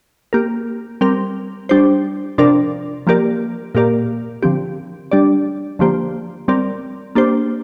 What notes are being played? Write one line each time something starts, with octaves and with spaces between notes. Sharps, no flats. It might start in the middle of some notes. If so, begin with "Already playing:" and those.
A#3 G4 A#4
G3 C4 A#4
G3 D4 G4 C5
C3 F3 D4 A#4 D5
F3 A#3 G4 A#4 D5
A#2 A#3 G4 A#4 D5
D3 F3 C4 G4
G3 D4 G4 D5
D3 F3 A#3 G4 C5
G3 C4 A#4 D5
A#3 D4 G4 C5